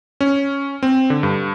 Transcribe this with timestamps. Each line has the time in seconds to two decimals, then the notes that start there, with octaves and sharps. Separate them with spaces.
0.21 C#4
0.83 C4
1.10 D3
1.23 G2